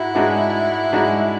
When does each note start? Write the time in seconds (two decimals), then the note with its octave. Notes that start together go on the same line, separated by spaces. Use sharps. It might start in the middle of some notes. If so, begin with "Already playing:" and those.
Already playing: G#2 E4 F#4
0.15 G#2 G#3 D4 F#4
0.93 G#2 G#3 D4 F#4